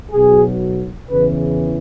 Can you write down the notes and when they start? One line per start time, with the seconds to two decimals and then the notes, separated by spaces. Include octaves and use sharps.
0.12 B1 B2 F#3 G#4
1.11 E2 C#3 E3 B4